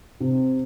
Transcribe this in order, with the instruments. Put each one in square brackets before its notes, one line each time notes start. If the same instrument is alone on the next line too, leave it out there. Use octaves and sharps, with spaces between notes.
[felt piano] C3